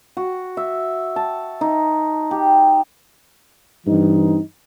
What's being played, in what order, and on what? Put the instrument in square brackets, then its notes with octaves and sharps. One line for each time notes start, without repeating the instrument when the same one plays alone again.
[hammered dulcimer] F#4
E5
A5
D#4
G4
[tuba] G2 [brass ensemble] E3 C4 D#4